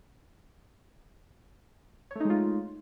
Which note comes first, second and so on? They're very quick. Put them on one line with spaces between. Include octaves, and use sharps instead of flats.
C#5 A3 D#4 G#3 F4